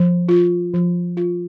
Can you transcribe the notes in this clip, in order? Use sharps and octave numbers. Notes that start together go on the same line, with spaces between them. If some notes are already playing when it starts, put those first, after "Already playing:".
Already playing: F3
F4
F3
F4